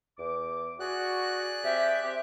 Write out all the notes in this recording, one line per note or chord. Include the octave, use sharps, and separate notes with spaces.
E2 D6
F#4 G#4 D5 F#6
C3 G4 E5
C4 G4